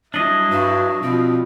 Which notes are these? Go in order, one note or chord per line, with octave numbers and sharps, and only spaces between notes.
F#3 G3 D4 E4 D#5
G2 F#4
B2 F3 C4